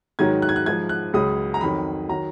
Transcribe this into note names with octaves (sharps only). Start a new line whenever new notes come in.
G#2 D#3 F#3 G#6
F#6
G#6
F#6
G#2 F3 G#6
F#6
C#2 C#3 F#3 D#6
A#5
F2 D#3 F#3 B5
D#3 F#3 A#5